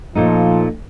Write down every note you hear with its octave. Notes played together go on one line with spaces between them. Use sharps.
A#2 F3 A3 D#4